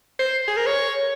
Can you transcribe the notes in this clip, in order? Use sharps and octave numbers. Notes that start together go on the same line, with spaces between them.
C5
G#4
A#4
C#5